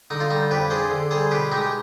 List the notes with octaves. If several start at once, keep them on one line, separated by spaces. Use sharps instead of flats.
D3 D#4
F4
G3 D#4
F2 G4 B4
D4 G#4 C5
D3
G3 G#4 C5
B2 G4 B4
G#3 D#4 G4
G4